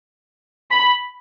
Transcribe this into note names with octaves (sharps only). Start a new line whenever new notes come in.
B5